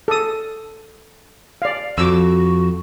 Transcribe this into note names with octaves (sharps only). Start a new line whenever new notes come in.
A4 D#6
D5 F5
F2 F#4 D6 E6